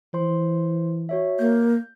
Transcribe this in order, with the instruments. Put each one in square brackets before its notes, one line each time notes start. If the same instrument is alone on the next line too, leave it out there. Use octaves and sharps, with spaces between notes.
[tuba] E3 [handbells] C5 C6
[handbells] F#4 C#5 E5
[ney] A#3 [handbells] G6